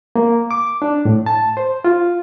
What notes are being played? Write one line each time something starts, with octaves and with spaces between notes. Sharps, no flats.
A#3
D6
D4
A2
A5
C5
F4